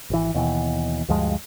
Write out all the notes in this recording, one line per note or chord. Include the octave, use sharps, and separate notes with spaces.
G#1 E3
D#2 B2 E3
D2 G2 F3 G#3